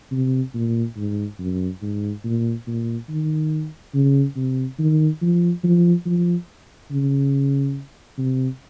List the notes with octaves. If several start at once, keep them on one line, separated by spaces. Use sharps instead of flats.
C3
A#2
G#2
F#2
G#2
A#2
A#2
D#3
C#3
C3
D#3
F3
F3
F3
C#3
C3